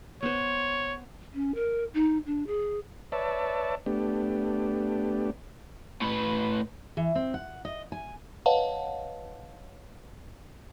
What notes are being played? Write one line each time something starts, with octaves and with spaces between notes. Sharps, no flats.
B3 C5 C#5
C#4
A#4
D#4
D4
G#4
B4 C#5 D5 E5 A5
A3 B3 D4 G4
A2 B4
E3
C4
F#5
D#5
G#5
B4 C#5 D#5 F5 F#5 A5